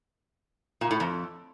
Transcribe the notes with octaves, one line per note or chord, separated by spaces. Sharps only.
A#2
A2
F2